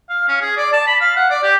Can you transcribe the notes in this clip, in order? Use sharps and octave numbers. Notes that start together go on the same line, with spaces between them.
F5
C#4
G#4
D5
A5
B5
F5
F#5
D5
G4